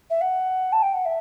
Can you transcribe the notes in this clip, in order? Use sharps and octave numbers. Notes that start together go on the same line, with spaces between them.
E5
F#5
A5
G5
F#5
E5